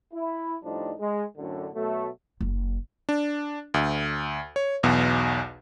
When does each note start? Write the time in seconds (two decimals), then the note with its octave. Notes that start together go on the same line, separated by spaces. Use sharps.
0.14 E4
0.64 A2 F3 G3 D4 D#4
1.00 G#3
1.37 F#2 A2 D3
1.75 B2 F#3 A3
2.41 F#1
3.09 D4
3.74 D2
4.56 C#5
4.83 B1 E2 B2